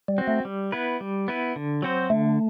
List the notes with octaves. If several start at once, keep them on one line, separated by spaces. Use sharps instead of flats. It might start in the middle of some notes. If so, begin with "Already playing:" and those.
G3
C4 F#4
A3
G3
B3 E4 B4
G3
B3 E4 B4
D3
F#3 C4 F#4 C5
D3 A3